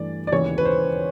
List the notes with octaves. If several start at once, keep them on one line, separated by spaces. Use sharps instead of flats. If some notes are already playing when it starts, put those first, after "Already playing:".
Already playing: G2 E3 A3 D5
D5
E1 D#2 C#3 E3 C#5
B4
C5